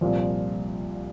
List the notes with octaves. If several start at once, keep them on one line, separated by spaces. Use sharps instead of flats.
C2 A#2 F3